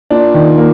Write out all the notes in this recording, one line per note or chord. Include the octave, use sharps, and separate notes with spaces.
A#2 D4
D#3
A#3